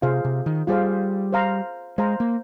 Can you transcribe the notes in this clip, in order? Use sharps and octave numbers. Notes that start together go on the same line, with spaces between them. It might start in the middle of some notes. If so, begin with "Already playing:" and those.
C3 F4 G#4 C5 F5
C3
D#3
G3 F4 G#4 C5 F5
C5 F5 A#5
G#3 C5 F5 A#5
A#3